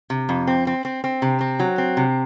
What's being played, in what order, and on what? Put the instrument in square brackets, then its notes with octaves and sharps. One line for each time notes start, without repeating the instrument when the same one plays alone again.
[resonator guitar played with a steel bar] C3
F2
C4
C4
C4
C4
C3
C4
F#3
C4
C3